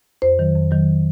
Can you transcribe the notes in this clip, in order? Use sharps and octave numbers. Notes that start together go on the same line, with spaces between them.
F2 C5
D#3 F#3
F2
D#3 F#3